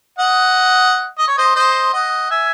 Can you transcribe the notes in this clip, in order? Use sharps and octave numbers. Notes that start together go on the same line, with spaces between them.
D#5 F#5
D#5
C#5
C5 D#5
C5 D#5
D#5 F#5
E5 G#5